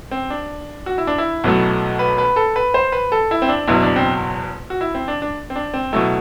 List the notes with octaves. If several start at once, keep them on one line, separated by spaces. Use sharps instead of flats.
C4
D4
F#4
E4
D4
E4
B1 B2 F#3 A3
B4
B4
A4
B4
C5
B4
A4
E4
C4
D4
F#1 E2 B2 F#3 E4
D4
C4
F#4
E4
C4
D4
D4
C4
D4
C4
B2 F#3 A3 E4